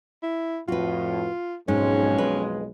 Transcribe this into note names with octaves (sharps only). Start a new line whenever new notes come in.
E4
F2 A2 F4 F#4 B4
B1 F2 G#2 G#3 C#4
B4